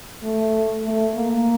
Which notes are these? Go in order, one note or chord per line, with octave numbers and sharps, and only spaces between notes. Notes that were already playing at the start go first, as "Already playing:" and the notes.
A3
A3
A#3